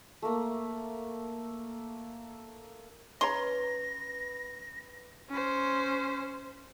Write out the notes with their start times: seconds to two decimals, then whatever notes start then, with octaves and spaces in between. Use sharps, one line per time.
0.22 A3 A#3
3.21 C#4 B4 C#5 A#5 C6 A#6
5.29 C#4 C5